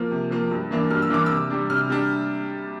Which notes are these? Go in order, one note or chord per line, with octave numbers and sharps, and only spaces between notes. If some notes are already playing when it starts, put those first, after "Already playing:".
Already playing: F3 A#3
C3
F3 A#3
G2
E3 A#3 D4
G2 F6
E6
E3 A#3 D4 D6
C3 E6
G3 D4
C3 F6
G3 D4